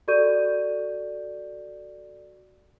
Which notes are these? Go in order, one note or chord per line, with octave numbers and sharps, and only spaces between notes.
F#4 A4 D5 C#6 G6 D#7